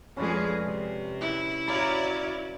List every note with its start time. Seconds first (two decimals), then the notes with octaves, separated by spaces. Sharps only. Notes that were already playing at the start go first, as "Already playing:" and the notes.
0.17 F2 G#3 C#4 G#4 B4 D5
0.64 C3
1.21 E4
1.68 F#4 C#5 D5 F5 A#5 B5